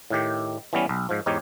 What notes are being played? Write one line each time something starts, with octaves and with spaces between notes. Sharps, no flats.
A2 D#3 G4
E3 G3 B3 C#4
B1
G#2 F3
E2 G#2 D#4 G4 C#5